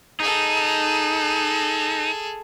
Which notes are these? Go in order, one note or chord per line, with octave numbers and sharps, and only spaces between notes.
D#4 G#4 A4